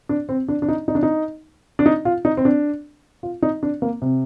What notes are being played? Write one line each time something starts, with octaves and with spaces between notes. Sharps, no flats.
D4
C4
D4
D4
D#4
D#4
D4
D#4
D4
D#4
F4
D#4
C4
D4
F4
D#4
D4
A#3
C3